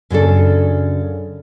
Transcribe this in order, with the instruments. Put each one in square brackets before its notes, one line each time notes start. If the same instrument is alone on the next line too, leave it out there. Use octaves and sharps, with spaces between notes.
[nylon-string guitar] F#2 C#3 D4 A4